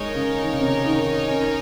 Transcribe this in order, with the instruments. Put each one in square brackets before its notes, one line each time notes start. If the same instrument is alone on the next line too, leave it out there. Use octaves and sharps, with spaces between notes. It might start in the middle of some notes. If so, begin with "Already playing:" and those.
Already playing: [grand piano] G#3 [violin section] D#4 A#4 C#5
[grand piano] C#3
D#3
C#3
C3
C#3
D#3
C#4